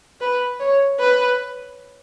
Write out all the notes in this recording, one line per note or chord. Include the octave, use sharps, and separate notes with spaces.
B4
C#5
B4